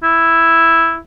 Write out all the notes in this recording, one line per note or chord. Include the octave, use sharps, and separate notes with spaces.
E4